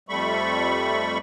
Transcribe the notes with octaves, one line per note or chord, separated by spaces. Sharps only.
F2 G3 A3 B5 C#6